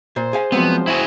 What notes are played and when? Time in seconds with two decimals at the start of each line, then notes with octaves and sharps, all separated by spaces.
0.16 A#2 C5
0.33 G#4 F5 G#5
0.52 F3 F#3 G#3 B3 C4
0.87 E4 F#4 G#4